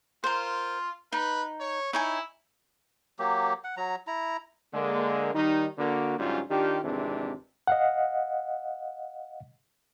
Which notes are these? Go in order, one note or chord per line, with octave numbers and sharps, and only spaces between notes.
F4 A#4 C5
D#4 B4
C#5
D#4 E4 C#5 G#5
F#3 A#3 G4
F#5
F#3 A#5
E4 A#5
D3 G#3 A#3
D#3 G3 D#4
D3 A#3 F#4
G#2 D3 F#3 G3 C#4 F4
D#3 D4 F4 G4
G#1 F2 C3 E3 G#3 D4
D#5 F5 F#5